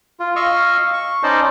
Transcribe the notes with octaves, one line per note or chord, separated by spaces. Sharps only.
F4
D#5 F5 C#6 E6 F6
C#6
C#4 D#4 C5 D5 D#5 A5